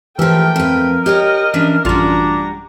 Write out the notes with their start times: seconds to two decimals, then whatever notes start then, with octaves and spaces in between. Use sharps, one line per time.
0.19 E3 F3 A3 G4 A#4 G5
0.56 F2 A#4 B4
1.06 G4 C#5 D#5 G5
1.54 E3 C#4 D4
1.85 A1 F#2 G3 D4 F4 F#4 A#5